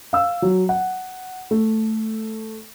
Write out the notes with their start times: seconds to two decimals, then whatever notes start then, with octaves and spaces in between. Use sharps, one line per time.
0.13 F5 E6
0.42 F#3
0.69 F#5
1.51 A3